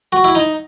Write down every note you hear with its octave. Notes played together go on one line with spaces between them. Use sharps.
F#4
E4
D#4